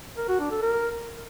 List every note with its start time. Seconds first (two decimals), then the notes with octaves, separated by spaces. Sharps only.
0.17 A#4
0.28 F#4
0.40 D4
0.51 A4
0.63 A#4